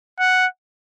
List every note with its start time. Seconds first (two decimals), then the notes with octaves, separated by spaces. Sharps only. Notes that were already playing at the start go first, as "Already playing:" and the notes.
0.20 F#5